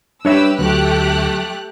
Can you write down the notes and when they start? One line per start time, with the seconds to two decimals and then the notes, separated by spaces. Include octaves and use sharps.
0.25 G3 D4 G4 B4 C#5 E5 E6
0.59 D2 F#3 A3 G4 F#6